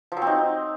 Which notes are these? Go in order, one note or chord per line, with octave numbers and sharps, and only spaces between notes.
F3
F#3
C4
D#4